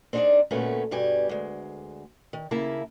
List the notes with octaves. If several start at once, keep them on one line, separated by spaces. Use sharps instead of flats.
C4 D4 D#4 F4 G#4 D5
D2 A#2 A3 B3 C#4 G#4
G2 B2 G3 G4 G#5
D2 G#3
D#3
D#2 C#3 A#3 E4 E5 A5